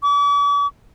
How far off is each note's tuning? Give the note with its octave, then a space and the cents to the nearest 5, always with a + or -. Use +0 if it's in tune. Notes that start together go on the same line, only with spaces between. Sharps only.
D6 -45